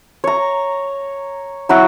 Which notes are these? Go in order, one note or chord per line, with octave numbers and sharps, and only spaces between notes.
C#5 A#5
F#3 E4 F#4 A#5